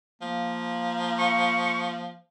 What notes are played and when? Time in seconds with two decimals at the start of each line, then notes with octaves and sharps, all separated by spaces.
0.22 F3 A#3
1.19 C#6